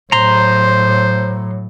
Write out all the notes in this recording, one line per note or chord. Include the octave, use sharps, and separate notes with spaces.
A2 F#3 C5 A#5 C6